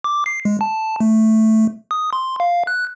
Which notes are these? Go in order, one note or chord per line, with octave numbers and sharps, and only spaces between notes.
D6
C7
G#3
A5
A3
D#6
C6
F5
F#6